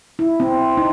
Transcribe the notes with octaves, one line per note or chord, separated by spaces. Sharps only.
E4
C4
D#4